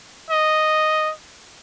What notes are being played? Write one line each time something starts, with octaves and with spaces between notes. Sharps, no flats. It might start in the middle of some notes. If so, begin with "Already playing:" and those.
D#5